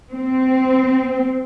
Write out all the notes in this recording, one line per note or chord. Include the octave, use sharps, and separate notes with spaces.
C4